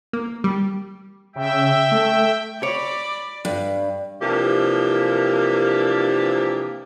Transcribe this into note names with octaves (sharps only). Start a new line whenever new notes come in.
A#3
G3
C#3 E5 G5
A3
C#5 D5 B5 D6
G2
C3 E3 F3 A#3 D4 G4